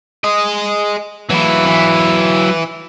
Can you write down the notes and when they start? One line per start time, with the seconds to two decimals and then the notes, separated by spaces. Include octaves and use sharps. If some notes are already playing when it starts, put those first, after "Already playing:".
0.24 G#4 D#5
1.30 E3 F#3 E4
1.66 E3